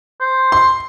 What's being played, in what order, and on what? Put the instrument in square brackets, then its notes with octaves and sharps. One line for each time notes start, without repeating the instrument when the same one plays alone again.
[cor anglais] C5
[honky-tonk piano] C6